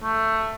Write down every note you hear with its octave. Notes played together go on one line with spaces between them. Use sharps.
A3